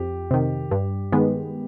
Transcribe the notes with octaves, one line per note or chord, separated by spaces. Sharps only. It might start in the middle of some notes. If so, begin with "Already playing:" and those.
Already playing: F2 G4
C3 D#3
G2
D#3 G#3 B3